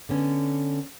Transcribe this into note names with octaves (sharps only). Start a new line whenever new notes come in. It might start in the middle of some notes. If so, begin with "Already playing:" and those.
D3 B3 C#4